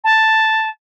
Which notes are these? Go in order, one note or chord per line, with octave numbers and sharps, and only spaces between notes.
A5